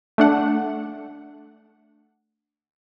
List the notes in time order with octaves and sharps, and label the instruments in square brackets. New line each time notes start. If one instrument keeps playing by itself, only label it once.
[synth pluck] A3 D4 F#5